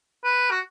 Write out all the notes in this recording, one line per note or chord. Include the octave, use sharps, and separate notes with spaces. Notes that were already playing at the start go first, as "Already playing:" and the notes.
B4
F#4